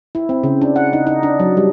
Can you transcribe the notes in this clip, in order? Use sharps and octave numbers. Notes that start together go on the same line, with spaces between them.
E4
C4
C#3
D4
F#5
D#4
D#4
D4
F#3
G3